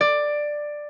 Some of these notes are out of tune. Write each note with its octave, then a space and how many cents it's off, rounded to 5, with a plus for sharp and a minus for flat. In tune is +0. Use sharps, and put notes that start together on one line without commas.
D5 +10